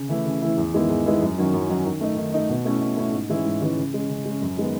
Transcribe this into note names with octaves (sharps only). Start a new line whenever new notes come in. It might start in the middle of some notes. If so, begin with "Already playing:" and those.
Already playing: C#3
E3 A3 E4
C#3
E3 A3 E4
E2
D#3 G#3 B3 E4
E2
D#3 G#3 B3 E4
F#2
D#3 F#3 C#4
F#2
D#3 F#3 C#4
D#3
A3 D#4
D#3
A3 D#4
B2
A3 C#4 E4
B2
A3 C#4 E4
G#2
E3 G#3 C#4 E4
G#2
E3 G#3 C#4 E4
C#3
G#3 C#4
C#3
G#3 C#4
F#2
D#3 G#3 B3